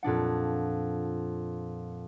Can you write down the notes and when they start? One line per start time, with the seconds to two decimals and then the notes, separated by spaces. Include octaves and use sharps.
0.03 F2 A#2 D4 F#5